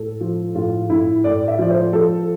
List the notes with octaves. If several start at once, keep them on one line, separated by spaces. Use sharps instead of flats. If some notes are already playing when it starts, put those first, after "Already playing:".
Already playing: A2 A4
F3
A2 F4
A2 E4
A2 D5
E5
F3 D5
C5
F3 A4